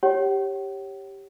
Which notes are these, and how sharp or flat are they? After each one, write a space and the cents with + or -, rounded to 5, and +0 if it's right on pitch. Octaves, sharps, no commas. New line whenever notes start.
G4 +0 C#5 -15 F#5 +45